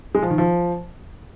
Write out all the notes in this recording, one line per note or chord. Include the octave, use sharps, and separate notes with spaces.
G#3
F3
D#3
F3